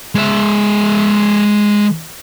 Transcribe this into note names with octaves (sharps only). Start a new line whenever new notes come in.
G#3 E5